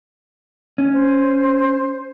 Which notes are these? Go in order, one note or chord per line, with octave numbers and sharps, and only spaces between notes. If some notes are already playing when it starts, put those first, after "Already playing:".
C#4
C5